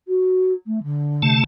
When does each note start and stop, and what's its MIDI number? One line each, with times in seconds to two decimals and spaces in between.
0.08 0.53 66
0.66 0.79 57
0.83 1.39 50
1.22 1.44 48
1.22 1.44 57
1.22 1.44 81